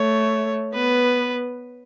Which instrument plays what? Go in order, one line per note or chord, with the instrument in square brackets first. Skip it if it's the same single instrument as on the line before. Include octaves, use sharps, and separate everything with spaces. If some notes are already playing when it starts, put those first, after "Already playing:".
Already playing: [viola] A3 [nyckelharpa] C#5
[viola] B3 [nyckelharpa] B4